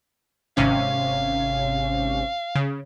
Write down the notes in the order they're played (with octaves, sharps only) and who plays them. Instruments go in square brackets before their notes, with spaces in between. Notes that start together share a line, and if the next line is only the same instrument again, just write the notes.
[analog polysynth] G#1 C3 C#4 [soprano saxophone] F5
[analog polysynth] C#3